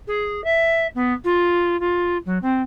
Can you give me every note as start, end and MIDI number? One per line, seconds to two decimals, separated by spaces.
0.07 0.44 68
0.44 0.87 76
0.95 1.14 59
1.24 1.79 65
1.80 2.17 65
2.26 2.38 54
2.42 2.62 60